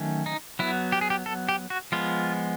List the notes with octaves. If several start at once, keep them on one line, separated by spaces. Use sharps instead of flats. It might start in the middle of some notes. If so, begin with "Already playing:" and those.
Already playing: D#3 F#3 A3 C#4
D#4
F#3 B3 E4
G4
G#4
G4
A4
G4
F#4
F3 G#3 B3 F4